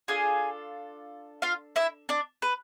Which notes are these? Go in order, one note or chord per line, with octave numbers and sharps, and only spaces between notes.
D4 F4 G#4 A4 G#5
F4 F5
E4 E5
D4 D5
B4